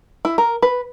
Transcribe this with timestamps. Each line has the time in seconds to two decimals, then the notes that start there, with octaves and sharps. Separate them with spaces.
0.25 E4
0.38 A#4
0.62 B4